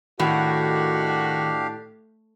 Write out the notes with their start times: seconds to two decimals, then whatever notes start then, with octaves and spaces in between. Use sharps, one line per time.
0.20 A2 D#3 D4 F#4 G4 F5